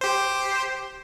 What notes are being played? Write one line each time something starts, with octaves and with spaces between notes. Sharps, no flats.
G4 C5